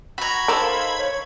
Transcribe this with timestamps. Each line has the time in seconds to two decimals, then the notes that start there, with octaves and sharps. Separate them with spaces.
0.18 F#4 A#5 B5 G#6
0.48 D#4 A4 A#4 C5
0.61 F5
0.98 C#5